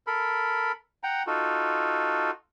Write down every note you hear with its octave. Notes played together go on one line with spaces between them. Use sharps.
A4 A#4 B5
F#5 G5 A#5
D#4 F4 F#4 A4